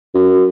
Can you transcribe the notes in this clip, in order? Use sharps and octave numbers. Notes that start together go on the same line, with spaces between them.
F#2